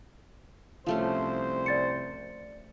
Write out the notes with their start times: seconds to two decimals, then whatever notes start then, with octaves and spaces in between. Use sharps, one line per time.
0.86 C2 F3 A3 C#4 C5
1.66 D5 A6 C#7